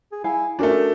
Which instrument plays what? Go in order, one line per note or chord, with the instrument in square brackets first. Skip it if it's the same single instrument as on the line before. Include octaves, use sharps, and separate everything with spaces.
[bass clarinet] G#4
[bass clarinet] E4 [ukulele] F5 G#5
[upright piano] A3 D4 [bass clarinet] C#4 [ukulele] F#4 A#4